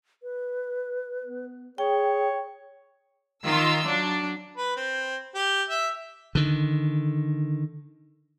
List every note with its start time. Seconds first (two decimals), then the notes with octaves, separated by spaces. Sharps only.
0.23 B4
1.24 B3
1.78 G#4 C#5 G5
3.45 D#3 F4 E6
3.86 F#3 D4
4.57 B4
4.76 C4
5.35 G4
5.70 E5
6.35 D3 D#3